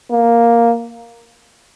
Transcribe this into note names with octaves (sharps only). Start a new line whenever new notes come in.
A#3